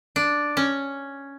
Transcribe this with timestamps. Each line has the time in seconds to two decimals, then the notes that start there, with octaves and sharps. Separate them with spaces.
0.16 D4
0.57 C#4